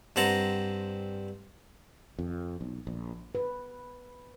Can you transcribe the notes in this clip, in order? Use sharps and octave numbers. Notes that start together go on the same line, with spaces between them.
G2 C4 F#5 A5 A#5
F2
B1
A#1
B4